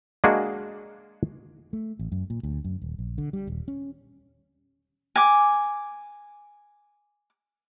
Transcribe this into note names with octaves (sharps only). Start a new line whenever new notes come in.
G#3 A#3 D4 F#4 G#4
A3
A1
F#2
A#2
D2
F#2
D#1
A#1
D3
G3
D#1
C#4
G#5 D6